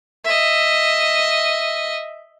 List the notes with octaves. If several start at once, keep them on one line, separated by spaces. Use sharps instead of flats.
D#5 E5